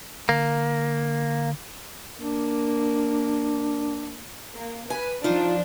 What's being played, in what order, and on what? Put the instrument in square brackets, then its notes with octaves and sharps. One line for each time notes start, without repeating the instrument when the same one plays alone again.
[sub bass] D3 [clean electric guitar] A#3
[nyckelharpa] A#3 [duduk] D4
[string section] A#3
[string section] B4 [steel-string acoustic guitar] G#5
[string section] F3 D4 [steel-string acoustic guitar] D#4 F4